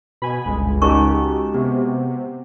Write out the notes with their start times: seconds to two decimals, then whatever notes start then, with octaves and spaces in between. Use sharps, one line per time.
0.22 B2 G#5 B5
0.46 G1 C#2 G#3
0.82 G#3 C#4 D#4 F#4 G4 A#4 A5 C#6
1.54 C3 B3